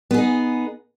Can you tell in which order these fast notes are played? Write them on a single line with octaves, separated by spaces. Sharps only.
B3 G#4 D#4